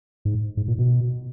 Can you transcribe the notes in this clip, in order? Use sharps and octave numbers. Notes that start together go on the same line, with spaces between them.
G#2
G#2
A#2
B2